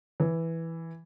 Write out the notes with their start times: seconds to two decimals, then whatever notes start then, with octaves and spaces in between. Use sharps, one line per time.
0.20 E3